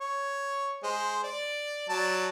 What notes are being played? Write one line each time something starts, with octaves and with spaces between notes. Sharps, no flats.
C#5
G#3 C5
D5
F#3 D5 A5